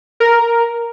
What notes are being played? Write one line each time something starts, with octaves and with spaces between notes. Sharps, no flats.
A#4